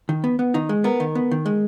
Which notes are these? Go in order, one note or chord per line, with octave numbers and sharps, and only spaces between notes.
D#3
B3
B3
D#3 D#4
G#3
B3 A#4
D#3
B3
D#3
G#3